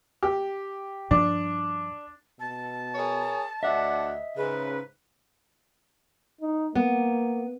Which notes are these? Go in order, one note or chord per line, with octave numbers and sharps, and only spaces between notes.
G4
G2 F3 D4
B2 A5
G#4 A#4 C#5
D2 D4 D#5 E5 F#5
G#2 C#3 B4
D#4
A#3 B3